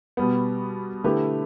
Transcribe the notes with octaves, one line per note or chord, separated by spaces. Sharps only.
B2 G3 B3
D3 A3 E4 G4 B4